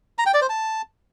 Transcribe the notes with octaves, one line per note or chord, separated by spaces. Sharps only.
A#5
G5
D5
C5
A5